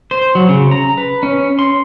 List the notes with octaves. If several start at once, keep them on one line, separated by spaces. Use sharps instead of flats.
C5
F#3
C#3
A#5
B4
C#4
C6